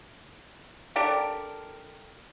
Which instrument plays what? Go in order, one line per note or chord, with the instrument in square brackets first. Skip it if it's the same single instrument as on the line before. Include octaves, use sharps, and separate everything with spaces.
[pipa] D4 G4 A4 A#4